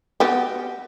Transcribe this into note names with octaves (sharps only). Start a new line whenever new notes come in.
B3 F#4 G4